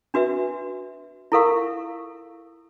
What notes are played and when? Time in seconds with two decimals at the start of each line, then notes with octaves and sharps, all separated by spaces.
0.14 D4 F#4 B4 E5
1.32 E4 F4 A4 A#4 F5 C#6